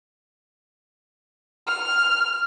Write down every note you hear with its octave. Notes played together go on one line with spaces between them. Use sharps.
F6